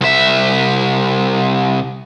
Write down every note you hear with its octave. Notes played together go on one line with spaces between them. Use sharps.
C2 E5